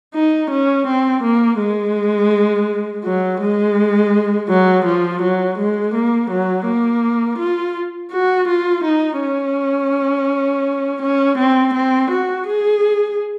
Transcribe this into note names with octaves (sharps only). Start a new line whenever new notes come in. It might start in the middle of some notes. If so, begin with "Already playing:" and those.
D#4
C#4
C4
A#3
G#3
F#3
G#3
F#3
F3
F#3
G#3
A#3
F#3
A#3
F4
F#4
F4
D#4
C#4
C#4
C4
C4
F#4
G#4